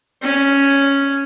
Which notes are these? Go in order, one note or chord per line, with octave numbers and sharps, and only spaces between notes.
C#4